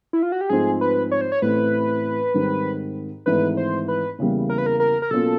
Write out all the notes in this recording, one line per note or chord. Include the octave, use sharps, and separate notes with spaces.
E4
F4
F#4
G4
G#2 F3 A3 C4 D#4 G#4
B4
C#5
C5
C#5
A1 A2 E3 A3 C4 B4
G#2 D#3 G3 C4
G#1 G#2 E3 A3 B4
C5
B4
E2 C#3 E3 G3 A#3
A#4
B4
A#4
A#4
A#4
B2 F#3 A#3 C#4 F4 A4